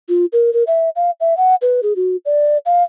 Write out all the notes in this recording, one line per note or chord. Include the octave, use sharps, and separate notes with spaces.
F4
A#4
A#4
E5
F5
E5
F#5
B4
G#4
F#4
D5
F5